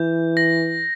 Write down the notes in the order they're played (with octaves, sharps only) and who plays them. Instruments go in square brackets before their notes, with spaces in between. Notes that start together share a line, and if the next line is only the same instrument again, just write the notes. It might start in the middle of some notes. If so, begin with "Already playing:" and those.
Already playing: [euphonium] E3 [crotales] G6
[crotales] A#6